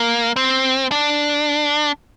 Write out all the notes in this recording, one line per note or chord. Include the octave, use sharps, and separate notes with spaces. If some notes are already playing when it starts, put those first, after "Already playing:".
Already playing: A#3
C4
D4